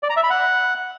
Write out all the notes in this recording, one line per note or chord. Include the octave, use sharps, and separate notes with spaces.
D5
A#5
E5
B5
F#5